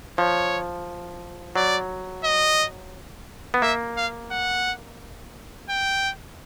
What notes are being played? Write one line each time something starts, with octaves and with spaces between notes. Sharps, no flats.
F3 C#5
F#3 D5
D#5
B3
A#3 E5
F5
F#5
G5